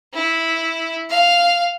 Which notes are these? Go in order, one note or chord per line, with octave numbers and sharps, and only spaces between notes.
E4
F5